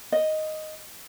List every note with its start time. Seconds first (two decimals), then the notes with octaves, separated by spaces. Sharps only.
0.12 D#5